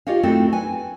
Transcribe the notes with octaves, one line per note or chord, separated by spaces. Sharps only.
F4 G4 G#4 C#5 D#5 F5
A3 C4 D#4 E4 F#4 A4
B4 G#5